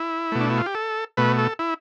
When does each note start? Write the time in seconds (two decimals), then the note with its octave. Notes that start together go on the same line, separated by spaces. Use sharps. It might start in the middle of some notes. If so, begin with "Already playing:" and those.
Already playing: E4
0.32 B2 A3
0.40 D4
0.50 E4
0.58 F4
0.66 G4
0.75 A4
1.17 B2 A3 B4
1.39 A4
1.59 E4